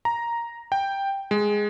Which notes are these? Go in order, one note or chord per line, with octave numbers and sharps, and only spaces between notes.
A#5
G5
G#3